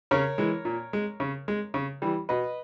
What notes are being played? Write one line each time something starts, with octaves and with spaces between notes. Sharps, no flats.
C#3 A#4 C#5
E3 G#3
A#2
G#3
C#3
G#3
C#3
E3 G3
B2 B4 D#5